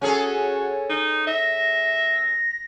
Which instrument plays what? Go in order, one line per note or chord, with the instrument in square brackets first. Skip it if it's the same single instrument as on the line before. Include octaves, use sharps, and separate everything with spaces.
[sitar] C#4 G#4 A4 [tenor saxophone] F#4 [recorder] C#5
[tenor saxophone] D#4
[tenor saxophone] E5 [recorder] A#6